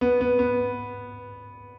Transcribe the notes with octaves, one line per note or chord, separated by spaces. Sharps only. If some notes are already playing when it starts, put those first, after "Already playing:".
B3
B3
B3